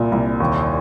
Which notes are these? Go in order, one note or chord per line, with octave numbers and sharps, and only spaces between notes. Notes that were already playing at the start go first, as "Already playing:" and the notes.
Already playing: C2 A#2
C2
D#2